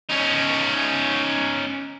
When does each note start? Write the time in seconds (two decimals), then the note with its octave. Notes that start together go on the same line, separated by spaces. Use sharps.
0.09 C#4 D#4